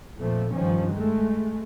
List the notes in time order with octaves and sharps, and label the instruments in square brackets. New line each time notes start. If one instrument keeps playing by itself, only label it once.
[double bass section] F2 A#2 F3 A3
G2 D#3 F3 C#4
G#3 A3